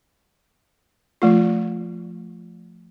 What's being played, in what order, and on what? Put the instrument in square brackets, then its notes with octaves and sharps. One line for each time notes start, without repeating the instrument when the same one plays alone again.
[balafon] F3 A3 F4